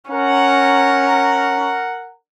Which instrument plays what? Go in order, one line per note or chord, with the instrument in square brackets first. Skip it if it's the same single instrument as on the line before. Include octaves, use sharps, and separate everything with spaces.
[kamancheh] C#4 [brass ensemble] A#4 F#5